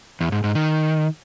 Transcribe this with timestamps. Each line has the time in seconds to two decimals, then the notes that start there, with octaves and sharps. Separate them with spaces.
0.21 E2
0.32 G#2
0.44 G#2
0.55 D#3